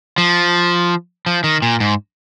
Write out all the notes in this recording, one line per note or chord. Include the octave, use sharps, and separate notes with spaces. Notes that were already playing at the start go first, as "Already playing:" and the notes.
F3
F3
D#3
A#2
G#2